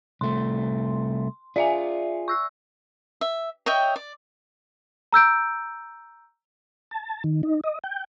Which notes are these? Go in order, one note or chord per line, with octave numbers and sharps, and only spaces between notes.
C2 A3 C6
F4 G#4 D5 E5 G#5
C#6 E6 F#6
E5
C#5 D#5 E5 G5
D5
A#5 E6 G6 D7
A5
D#3
D#4
D#5
G5